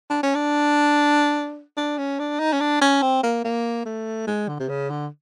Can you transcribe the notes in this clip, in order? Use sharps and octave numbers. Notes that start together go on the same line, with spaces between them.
D4
C#4
D4
D4
C#4
D4
D#4
C#4
D4
C#4
C4
A#3
A#3
A3
G#3
D3
C3
C#3
D3